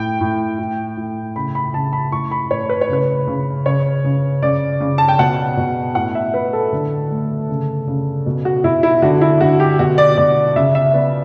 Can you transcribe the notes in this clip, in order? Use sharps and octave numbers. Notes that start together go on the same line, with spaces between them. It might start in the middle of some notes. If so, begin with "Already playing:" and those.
Already playing: A2 G5
A2
A2
A2
C#3 B5
B5
C#3 A5
B5
A2 C#6
B5
A2 C#5
B4
C#5
C#3 B4
C#3
C#3 C#5
C#3
C#3 D5
C#3
A5
G5
B2 F#5
B2
A2 F#5
E5
A2 B4
A4
D3
A3
C#3
C#3
B2
F#4
B2 E4
E4
D3 F#4
E4
D3 F#4
G4
B2 F#4
D5
B2 D5
C#3 E5
E5
B3 D5